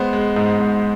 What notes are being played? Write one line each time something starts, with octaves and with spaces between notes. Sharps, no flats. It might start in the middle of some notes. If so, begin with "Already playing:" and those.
Already playing: G#3 B3 C5
G#3
G#2
G#2